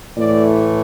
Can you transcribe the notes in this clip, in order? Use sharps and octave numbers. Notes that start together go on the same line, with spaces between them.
A2 E3 A3 D5